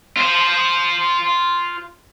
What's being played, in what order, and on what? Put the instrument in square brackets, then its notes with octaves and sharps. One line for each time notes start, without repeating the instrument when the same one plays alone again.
[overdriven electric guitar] F4 C5